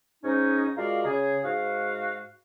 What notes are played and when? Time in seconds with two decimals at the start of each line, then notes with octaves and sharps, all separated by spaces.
0.23 G#2 C#4 D#4
0.77 G#3 F4 F#4 A#4 D5 F5
1.05 C#3 G#4
1.44 G#2 F#4 F5